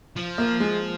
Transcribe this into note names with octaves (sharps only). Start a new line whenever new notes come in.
F3
A#3
G#3